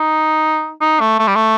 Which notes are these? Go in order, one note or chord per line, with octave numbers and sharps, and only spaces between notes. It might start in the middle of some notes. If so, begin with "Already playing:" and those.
Already playing: D#4
D#4
A3
A3
G3
A3